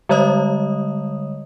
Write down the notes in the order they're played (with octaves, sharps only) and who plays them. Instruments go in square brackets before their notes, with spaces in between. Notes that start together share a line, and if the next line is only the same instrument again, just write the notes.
[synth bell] D3 G3 G#3 C#5 D#5 D#6